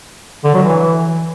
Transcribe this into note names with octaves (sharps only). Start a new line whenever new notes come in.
D3
F#3
E3